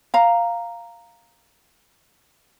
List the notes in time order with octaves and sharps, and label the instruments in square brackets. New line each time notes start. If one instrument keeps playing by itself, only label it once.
[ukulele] F5 A#5